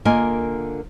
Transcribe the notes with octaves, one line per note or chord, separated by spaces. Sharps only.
D3 A#3 F4 A#4 D#5 G#5